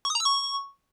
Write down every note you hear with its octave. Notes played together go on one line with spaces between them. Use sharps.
C#6
D#6
A#5
E6
C#6